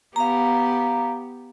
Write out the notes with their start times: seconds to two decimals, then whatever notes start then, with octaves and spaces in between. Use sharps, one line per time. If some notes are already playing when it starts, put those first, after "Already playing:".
0.16 B3 G4 F5 A#5